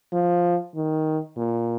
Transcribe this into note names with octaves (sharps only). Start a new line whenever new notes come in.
F3
D#3
A#2